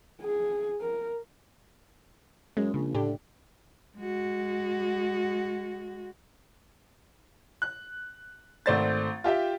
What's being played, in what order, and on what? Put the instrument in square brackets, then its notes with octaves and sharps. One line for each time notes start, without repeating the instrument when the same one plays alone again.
[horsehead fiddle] G#4
A#4
[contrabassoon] F#2 [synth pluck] G#3
[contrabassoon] A#1 [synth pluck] C#3
[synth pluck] A2 D4 G4 [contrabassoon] D3
[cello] G#3 F#4
[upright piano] F#6
G#1 A3 C5 D5 A6
F4 G4 E5 G5